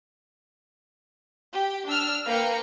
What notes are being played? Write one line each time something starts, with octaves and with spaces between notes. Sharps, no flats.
G4
D4 E6 F6
A#3 B4 F5 G5 C#7